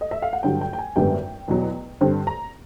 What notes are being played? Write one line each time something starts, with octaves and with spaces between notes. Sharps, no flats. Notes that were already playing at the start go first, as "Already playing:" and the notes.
D#5
E5
F5
F#5
G2 D3 F#3 G5
G5
G5
G#5
G#1 F#2 D3 G3 B3 G5
E2 B2 F#3
G2 D3 G3 C4
A#5